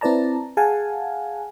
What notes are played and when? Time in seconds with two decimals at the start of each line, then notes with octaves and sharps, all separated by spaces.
0.01 C4 E4 B4 D5 A5 A#5
0.57 G#4 F5 F#5 G#5 A5